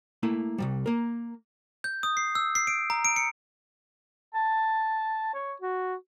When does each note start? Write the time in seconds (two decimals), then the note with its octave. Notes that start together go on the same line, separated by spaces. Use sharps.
0.23 A3 A#3 E4
0.58 C2 G#2 G3
0.86 A#3 A#4
1.84 G6
2.03 D#6
2.17 C7
2.35 E6
2.55 C7
2.67 D7
2.90 A#5
3.05 D7
3.16 C#7
4.35 A5
5.34 C#5
5.62 F#4